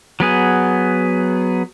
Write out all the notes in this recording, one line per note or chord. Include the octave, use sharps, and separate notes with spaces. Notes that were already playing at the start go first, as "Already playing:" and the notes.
F#3 B3 G#4